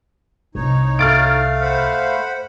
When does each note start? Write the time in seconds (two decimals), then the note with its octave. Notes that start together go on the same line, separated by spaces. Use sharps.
0.55 C2 D#4 C#5
0.99 A3 F5 F6 A6 D7
1.61 C5 F#5 B5